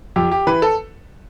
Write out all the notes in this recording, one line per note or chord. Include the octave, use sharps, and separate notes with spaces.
F2 G4
G4
E3 B4
A4